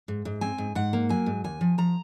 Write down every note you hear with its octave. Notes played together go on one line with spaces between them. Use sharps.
G#2
G#2
C4 G#5
G#2
G#2 F#5
A#3
F#3 G#5
G#2
D#2 G#5
F3
F3 A#5